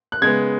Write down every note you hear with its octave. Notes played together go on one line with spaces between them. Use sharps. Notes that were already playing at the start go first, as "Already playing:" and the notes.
F#6
C#3 G#3 B3 G#6